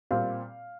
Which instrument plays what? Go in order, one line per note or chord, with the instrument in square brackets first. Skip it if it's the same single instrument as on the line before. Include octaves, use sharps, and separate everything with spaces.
[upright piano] A#2 G3 C4 [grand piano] F5